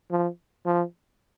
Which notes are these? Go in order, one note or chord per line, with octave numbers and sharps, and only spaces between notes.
F3
F3